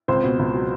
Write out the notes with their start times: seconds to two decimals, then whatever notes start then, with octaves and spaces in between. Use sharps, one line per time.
0.08 C#2 C4 C5
0.24 B2
0.39 C#2
0.54 F#3